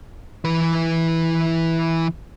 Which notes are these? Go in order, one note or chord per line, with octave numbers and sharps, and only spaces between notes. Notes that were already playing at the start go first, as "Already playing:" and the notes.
E3 B4